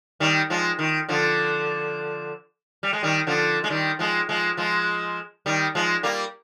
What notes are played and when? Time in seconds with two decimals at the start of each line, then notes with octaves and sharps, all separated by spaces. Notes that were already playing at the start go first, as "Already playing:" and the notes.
0.20 D#3 G3
0.50 F3 G#3
0.79 D#3
1.09 D3 F3
2.83 G3
2.93 G#3
3.03 D#3 G3
3.27 D3 F3
3.64 G#3
3.70 D#3 G3
3.99 F3 G#3
4.29 F3 G#3
4.57 F3 G#3
5.46 D#3 G3
5.75 F3 G#3
6.03 G3 A#3